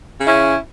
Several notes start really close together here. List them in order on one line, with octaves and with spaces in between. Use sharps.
C#3 E4 C#4